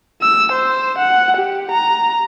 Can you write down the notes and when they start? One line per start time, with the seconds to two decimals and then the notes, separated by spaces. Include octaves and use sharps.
0.22 E6
0.52 C5
0.98 F#5
1.37 G4
1.71 A#5